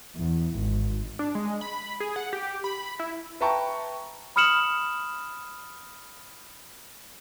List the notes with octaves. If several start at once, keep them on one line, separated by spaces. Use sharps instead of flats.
E2
G#1
D4
G#3
B5
G#4
F#5
G4
B5
E4
B4 E5 G5 A5 A#5 C#6
B5 D#6 F6 C#7 E7 F#7